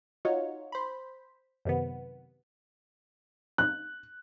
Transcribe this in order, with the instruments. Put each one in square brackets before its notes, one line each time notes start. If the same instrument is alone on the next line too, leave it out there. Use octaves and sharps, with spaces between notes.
[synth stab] D#4 F4 F#4 C#5
C5 B5
F#2 C3 D#3 B3
[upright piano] F#6